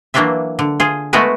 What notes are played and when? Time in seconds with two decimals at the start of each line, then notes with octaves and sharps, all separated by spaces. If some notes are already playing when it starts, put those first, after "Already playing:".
0.14 E3 F#3 A#3 D4 F4 E5
0.59 D3
0.80 F4 G#4
1.13 G#3 A3 B3 F#4 A#4 B4